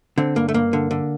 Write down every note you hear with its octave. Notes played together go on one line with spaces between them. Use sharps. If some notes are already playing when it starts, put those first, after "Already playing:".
D3 C4
G2 A#3
A3
G2 A#3
D3
D3